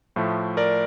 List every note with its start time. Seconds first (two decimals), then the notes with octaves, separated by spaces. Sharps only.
0.16 A2 F3 A3
0.57 A#4 D5